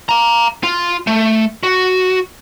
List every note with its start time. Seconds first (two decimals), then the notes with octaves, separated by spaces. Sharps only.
0.09 F5 A#5
0.63 F4
1.07 A3
1.63 F#4